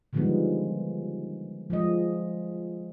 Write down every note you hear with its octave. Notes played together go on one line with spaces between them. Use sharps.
D3 D#3 F3 G3 G#3 B3
F3 G#3 D#5